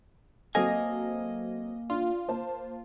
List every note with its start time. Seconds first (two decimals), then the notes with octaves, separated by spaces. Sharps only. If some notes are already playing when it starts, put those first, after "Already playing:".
0.55 F#3 A#3 C4 A4 D#5 F5 G#5
1.90 D4 F4
2.28 A#3 C5 A5